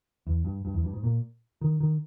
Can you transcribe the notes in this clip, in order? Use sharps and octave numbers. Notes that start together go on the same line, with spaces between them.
E2
G2
G2
E2
G2
G#2
A#2
D#3
D#3